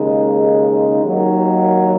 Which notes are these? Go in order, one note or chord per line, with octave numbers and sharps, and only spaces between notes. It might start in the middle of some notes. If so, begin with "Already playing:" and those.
Already playing: D#2 C#3 G#3 D#4
D#2 D#3 F#3